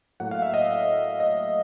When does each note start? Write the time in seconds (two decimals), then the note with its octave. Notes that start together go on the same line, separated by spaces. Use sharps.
0.20 A2 F#3 A#3 F#5
0.31 F5
0.42 E5
0.54 D#5
1.20 D#5